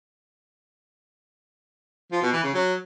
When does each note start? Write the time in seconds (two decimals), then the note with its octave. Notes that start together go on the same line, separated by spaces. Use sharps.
2.12 F3
2.23 B2
2.33 E3
2.44 C#3
2.54 F#3